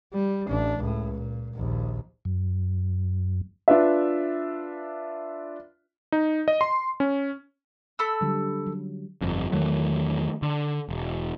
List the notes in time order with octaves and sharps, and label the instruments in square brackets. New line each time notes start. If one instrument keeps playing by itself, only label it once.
[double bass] G3
A1 D4
C#2 A2
A#2
A#1 D#2
[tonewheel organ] F#2
[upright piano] D4 F4 B4 E5
[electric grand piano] D#4
D#5
C6
C#4
[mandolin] A4 B5 E6
[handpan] D3 F#3 G3
F#3
[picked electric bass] G1 F2
E2 D#3 F#3 A3
D3
E1